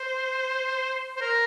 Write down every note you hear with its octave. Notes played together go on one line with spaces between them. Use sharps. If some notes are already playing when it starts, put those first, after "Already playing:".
Already playing: C5
C5
A#4